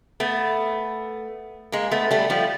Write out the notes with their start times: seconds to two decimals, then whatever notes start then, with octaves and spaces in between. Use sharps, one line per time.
0.20 A3 B3
1.72 G#3 A#3
1.91 A3 B3
2.11 G3 A3
2.30 F3 G3